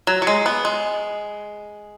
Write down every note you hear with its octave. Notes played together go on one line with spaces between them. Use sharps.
F#3
F#3
G#3
B3
G#3